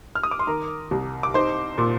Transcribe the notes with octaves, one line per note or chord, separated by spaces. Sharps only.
F6
D#6
D6
C6
D#3 A#4 A#5
C2
D6
D#4 C5 C6
A#2